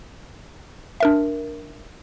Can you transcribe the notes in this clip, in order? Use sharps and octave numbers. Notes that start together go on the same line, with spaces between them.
D4 A#4 E5